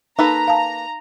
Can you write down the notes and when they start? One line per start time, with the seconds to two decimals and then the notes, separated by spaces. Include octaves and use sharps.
0.19 A#3 D#4 A4 B4 A#5
0.48 F5 A5